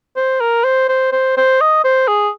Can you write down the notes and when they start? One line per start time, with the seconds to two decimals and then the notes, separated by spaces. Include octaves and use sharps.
0.17 C5
0.41 A#4
0.64 C5
0.89 C5
1.12 C5
1.37 C5
1.61 D#5
1.84 C5
2.08 G#4